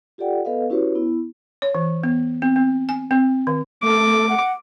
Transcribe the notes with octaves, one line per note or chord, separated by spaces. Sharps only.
F4 G4 A4 D5 F#5 G5
B3 A4 B4 D#5 F5
C#4 E4 F#4 G4 B4 C#5
B3 E4
C#5
E3
B3
C4
C4
G#5
C4
D#3
A3 A4 D6
F#5